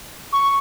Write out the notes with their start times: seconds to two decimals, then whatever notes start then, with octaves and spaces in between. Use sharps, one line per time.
0.32 C#6